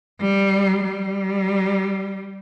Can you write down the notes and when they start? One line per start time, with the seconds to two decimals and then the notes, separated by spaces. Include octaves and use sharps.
0.21 G3
0.85 G3